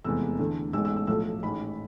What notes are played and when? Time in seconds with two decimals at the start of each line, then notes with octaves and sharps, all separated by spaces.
0.04 F1 E2 C3 G#3 B3 E6
0.39 E2 D3 A3
0.73 A1 G#2 G#3 B3 E6
0.85 E6
0.96 E6
1.07 B1 A2 F3 A3 E6
1.43 A1 G#2 G#3 B5